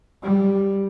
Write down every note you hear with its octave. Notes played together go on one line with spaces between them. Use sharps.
G3